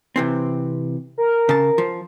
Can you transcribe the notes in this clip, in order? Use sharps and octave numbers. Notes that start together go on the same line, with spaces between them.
C3 E3 C4
A#4
C#3 A5
F3